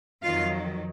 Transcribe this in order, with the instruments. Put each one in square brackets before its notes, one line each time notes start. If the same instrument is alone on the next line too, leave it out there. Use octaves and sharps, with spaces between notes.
[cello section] F2 D#3 F#3 F4 F5